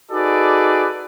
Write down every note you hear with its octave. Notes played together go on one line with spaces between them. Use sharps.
D#4 F#4 G#4 A4 B4 D5